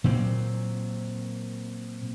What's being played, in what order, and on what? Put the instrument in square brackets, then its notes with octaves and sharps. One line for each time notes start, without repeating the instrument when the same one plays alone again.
[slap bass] A#2 F#3 C4